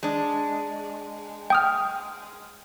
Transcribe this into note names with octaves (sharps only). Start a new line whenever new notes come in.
G#3 D4
G5 D#6 F6